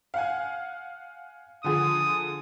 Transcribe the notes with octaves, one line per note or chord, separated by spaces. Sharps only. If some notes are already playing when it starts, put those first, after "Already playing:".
F5 F#5 G#5
D3 F3 G#4 D#6